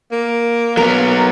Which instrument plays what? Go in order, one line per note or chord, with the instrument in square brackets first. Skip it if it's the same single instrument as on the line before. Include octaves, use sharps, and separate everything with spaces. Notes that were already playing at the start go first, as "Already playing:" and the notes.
[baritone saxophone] A#3
[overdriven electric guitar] F#3 B3 [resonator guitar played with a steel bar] A#4